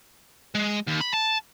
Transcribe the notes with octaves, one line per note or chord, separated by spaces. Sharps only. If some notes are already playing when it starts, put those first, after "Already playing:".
G#3
D#2
B5
A5